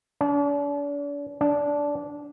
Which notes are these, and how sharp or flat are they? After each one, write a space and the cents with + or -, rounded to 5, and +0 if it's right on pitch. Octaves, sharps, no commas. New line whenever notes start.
D4 -40
D4 -15